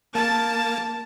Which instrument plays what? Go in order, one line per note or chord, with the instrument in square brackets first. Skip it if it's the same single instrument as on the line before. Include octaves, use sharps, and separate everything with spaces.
[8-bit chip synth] A#3 [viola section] A5